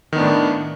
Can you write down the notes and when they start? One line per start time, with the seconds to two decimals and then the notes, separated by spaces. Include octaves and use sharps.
0.13 D#3
0.15 B3
0.18 D4
0.21 A2